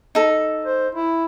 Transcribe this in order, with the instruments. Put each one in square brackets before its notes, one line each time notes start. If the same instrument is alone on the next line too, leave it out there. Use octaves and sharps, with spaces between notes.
[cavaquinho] D#4 A4
[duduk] C5
E4